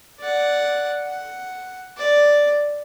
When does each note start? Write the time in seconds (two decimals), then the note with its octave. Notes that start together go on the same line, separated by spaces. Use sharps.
0.20 D5 F#5
1.04 F#5
1.97 D5